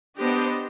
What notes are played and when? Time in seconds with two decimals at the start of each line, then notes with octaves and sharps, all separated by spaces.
0.17 B3 D4 G4 C5 D#5